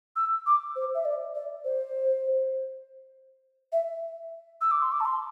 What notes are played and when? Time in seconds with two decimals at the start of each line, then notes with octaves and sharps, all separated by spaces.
0.16 E6
0.46 D6
0.76 C5
0.95 E5
1.05 D5
1.35 D5
1.65 C5
3.72 E5
4.61 E6
4.71 D6
4.82 C6
4.92 D6
5.00 A5
5.05 C6